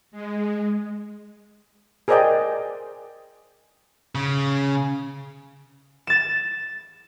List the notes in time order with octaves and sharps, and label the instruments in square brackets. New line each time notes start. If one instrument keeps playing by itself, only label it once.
[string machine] G#3
[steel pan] G#4 A#4 C5 D5 D#5 G5
[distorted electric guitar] C#3
[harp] A6 E7